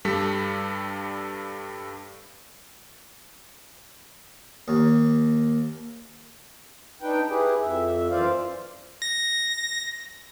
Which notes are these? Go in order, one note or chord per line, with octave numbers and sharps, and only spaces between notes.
G2 G3 A4 B6
D#2
D4 D#4 B4 G5
E4 G4 G#4 B4
F2 E5
F#2 E3 F4 C5 D5 F5
A#6